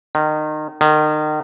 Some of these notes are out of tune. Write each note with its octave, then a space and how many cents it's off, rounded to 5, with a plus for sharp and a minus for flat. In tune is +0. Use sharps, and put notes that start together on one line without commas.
D#3 -25
D#3 -30